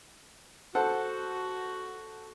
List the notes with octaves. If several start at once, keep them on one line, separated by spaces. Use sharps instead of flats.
F#4 A4 C5 F#5